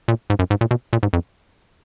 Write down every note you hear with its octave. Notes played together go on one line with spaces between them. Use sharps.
A#2
G#2
F#2
G#2
A#2
B2
A#2
G#2
F2